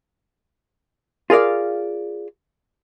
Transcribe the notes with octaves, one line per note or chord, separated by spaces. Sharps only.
F4 G#4 A#4 D5 F5